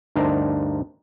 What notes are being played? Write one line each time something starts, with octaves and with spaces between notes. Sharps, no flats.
D2 G2 D4 D#4 A#4 C5